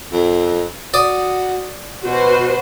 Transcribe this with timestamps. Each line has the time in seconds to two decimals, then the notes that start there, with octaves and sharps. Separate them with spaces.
0.12 F2
0.94 F#4 D5 D#6
2.04 B2 F#4 B4 C5